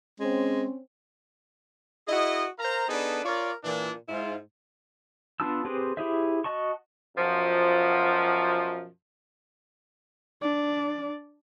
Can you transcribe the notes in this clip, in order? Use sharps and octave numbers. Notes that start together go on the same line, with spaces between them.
G#3 C4 C#4
E4 F#4 G#4 D#5
A#4 C5 F5 A#5
B3 D4 D#4 G#4 A4 B4
F4 A#4 C#5 D5
A#2 E3 D4
G#2 E4 F4
B3 D4 F4 A5 E6
C4 G4 G#4 B4 C5
E4 G4 G#4 C5 E5
F#4 D#5 A5 C#6
F#2 B2 F3
D4 D5